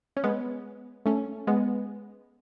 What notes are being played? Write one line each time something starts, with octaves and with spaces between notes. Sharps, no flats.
C#4
G#3 B3
A3 C#4
G#3 B3